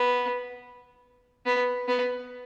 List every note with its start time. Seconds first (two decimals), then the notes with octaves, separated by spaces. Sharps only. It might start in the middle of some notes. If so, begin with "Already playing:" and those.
Already playing: B3
1.46 B3
1.88 B3